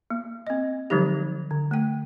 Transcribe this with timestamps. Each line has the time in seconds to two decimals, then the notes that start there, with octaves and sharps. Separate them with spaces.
0.10 A#3
0.47 C4 D#5
0.90 D3 F3 F#3 G#3 D#4 G4
1.51 D3
1.71 A3 G5